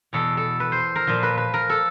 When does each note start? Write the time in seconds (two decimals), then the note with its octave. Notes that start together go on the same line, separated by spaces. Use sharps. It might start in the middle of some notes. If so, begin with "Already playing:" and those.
0.13 E2 B2 A4
0.37 A4
0.60 B4
0.72 C5
0.95 A#4
1.07 A#2 F3
1.23 B4
1.37 B4
1.54 A#4
1.70 A4